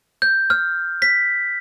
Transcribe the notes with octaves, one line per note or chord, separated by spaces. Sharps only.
G6
F6
B6